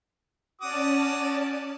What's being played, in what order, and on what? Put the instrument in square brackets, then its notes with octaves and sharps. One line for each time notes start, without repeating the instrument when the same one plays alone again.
[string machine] C#4 D5 A5 [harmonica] F#4 D6 D#6